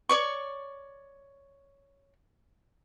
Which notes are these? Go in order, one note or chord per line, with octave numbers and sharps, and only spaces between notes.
C#5 D5 C#6